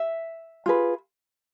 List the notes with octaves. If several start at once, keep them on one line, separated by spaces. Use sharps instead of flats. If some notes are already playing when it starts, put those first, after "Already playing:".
Already playing: E5
F4 G#4 B4